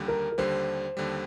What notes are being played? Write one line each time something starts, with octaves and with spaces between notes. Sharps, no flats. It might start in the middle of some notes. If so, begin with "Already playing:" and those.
Already playing: D#2 D3 G3
A#4
A#4
D#2 D3 G3 C5
D#2 D3 G3